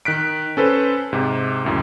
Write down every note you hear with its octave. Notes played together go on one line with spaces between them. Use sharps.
D#3 F#6 B6 D7
C#4 A4 B4 C5
G#2 C3
C#2 F#2 A2